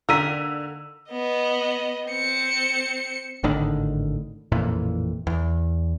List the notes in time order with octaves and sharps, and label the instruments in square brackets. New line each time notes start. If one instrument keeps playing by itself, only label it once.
[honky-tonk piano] D3 B6 [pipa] D#3 A#3 A#4 [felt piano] E6 D#7
[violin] B3 D#5
C4 C#7
[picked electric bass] G#1 A2 D3 D#3
A1 F2 A#2 E3
E2